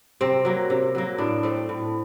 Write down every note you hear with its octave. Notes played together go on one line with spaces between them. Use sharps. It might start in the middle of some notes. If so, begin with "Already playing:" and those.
C3 C4
F#3 A#3
C3
F#3 A#3
A2 D4
A3 C4
A2